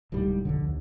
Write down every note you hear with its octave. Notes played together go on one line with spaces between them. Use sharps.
D1 C2 G#2 G3
B1 F2 D3
D#2